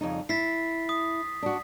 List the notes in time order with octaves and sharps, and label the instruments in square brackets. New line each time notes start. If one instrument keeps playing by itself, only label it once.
[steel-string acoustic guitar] F2 C#3 D#4
[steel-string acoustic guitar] E4 [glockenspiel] A6 B6 C7
[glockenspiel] D#6
[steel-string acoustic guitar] D4 F#4